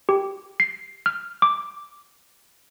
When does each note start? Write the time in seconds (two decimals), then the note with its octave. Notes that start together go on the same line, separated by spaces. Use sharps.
0.09 G4
0.60 C7
1.06 F6
1.42 D6